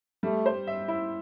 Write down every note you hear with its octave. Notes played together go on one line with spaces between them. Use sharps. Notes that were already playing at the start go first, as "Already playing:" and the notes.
G3 A3
C5
E5
E4